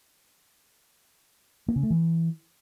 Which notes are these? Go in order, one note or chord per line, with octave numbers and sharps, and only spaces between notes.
A#3
C#3
A3
E3